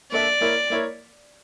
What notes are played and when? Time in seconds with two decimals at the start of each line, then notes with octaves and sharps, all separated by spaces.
0.12 A#3 D4 A4 D5 E5
0.41 A#3 E4 A#4 C#5
0.70 A#3 E4 A#4 C#5